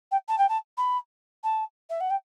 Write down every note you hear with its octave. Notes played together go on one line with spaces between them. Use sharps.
G5
A5
G5
A5
B5
A5
E5
F#5
G5